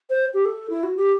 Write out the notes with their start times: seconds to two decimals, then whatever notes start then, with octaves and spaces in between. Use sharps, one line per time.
0.10 C5
0.34 G4
0.45 A4
0.70 E4
0.83 F#4
0.97 G4